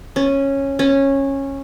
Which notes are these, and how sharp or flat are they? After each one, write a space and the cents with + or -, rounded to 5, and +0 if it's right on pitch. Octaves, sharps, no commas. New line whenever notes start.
C#4 -10
C#4 -15